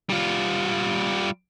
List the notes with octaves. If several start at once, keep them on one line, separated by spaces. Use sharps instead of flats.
G3 F4